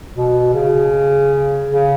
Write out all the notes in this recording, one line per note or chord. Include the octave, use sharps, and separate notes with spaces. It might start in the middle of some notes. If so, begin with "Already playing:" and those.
B2
C#3
C#3